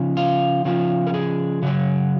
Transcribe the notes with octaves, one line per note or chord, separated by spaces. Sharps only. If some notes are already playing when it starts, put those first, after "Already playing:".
Already playing: C#3 F3
F4
C#3 F3 F4
A#4
G#4
C#3 F#3 F#4